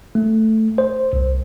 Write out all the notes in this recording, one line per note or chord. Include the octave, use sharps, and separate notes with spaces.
A3
C5
C2